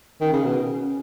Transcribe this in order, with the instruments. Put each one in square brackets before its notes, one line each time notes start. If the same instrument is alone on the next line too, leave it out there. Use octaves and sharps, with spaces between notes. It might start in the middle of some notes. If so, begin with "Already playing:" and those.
[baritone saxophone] D#3 [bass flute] C#4
[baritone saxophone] C#3
B2